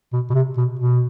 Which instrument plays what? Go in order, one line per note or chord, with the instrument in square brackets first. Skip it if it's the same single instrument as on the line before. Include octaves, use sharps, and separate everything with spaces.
[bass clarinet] B2
B2
C3
B2
B2